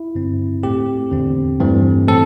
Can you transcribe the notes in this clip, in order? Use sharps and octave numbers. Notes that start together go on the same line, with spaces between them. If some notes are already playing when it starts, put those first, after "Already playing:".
Already playing: E4
G2 D3 C4
A2 A3 C4 G4
E2 D3 C4
G2 E3 A3 C4
A2 E3 C4 A4